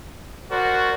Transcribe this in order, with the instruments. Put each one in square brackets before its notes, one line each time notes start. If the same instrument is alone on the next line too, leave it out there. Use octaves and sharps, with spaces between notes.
[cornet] F#4 [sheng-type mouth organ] A#4 C5 D5